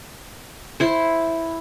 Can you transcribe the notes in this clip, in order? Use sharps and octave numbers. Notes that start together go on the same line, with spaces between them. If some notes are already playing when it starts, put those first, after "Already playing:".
E4 C5